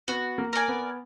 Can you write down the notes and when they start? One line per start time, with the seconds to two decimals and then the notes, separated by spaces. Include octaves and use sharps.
0.08 B3 F#4
0.38 A#3
0.53 A#4 D5 G#5
0.68 B3